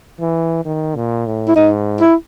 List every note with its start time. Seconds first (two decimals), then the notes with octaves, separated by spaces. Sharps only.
0.21 E3
0.65 D#3
0.95 A#2
1.26 A2
1.48 E4
1.56 G#2 D#4
2.01 E4